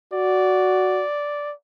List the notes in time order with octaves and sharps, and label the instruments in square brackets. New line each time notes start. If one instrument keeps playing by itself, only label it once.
[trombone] F#4 [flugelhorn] D5